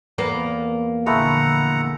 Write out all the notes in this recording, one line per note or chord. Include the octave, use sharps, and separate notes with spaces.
E2 A#3 B3
A#1 D3 G#3 A3 E4 F#5 A#5